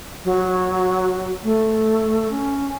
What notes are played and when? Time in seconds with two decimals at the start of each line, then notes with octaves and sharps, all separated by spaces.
0.25 F#3
1.43 A3
2.30 C#4